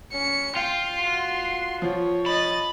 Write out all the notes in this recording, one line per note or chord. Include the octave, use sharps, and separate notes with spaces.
C#4 C#7
F4 G5 C6
F#4
F3 C#5
D#5 B5 A6